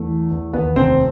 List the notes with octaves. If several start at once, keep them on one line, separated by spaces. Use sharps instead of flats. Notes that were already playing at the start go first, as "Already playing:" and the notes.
Already playing: E2 A3
E3
E2
D#2 B3 B4
F1 C4 C5